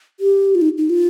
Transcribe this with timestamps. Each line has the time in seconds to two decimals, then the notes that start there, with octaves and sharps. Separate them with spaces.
0.20 G4
0.55 F4
0.62 D#4
0.78 D#4
0.90 F4